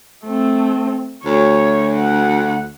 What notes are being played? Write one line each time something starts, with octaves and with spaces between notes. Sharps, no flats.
A3 C4
D2 C#5
F#5